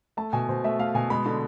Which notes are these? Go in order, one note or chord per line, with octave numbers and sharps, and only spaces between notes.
A3 A5
B2 G#5
B2 C5
A3 E5
A3 F5
B2 G#5
G#3 B5
D3